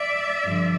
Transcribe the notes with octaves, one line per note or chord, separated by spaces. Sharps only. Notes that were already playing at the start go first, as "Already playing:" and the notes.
Already playing: D5 E5
G2 D3 F3